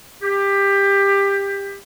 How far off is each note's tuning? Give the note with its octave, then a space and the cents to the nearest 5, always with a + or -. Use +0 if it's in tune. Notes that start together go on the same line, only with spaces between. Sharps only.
G4 +20